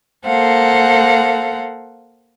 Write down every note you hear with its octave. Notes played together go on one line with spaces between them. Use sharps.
A#3 A4 C5 F5 F#5